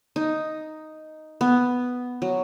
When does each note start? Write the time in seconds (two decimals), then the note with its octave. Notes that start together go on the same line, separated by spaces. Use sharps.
0.16 D#4
1.41 B3
2.22 F#3